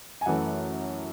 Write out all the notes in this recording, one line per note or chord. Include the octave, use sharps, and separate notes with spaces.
G#5
F#2 E3 A3 F#5